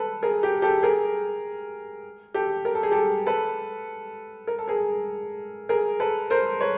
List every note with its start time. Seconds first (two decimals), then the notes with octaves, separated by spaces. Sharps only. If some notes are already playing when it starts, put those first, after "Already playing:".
Already playing: A4 B4
0.23 G#4 A#4
0.43 G4
0.62 G4 A4
0.83 G#4 A#4
2.34 G4 A4
2.65 A#4
2.75 A4
2.83 G#4
2.91 G4 A4
3.26 A4 B4
4.47 A#4
4.59 A4
4.68 G#4 A#4
5.69 G#4 A#4
6.00 A4 B4
6.30 A#4 C5
6.61 B4 C#5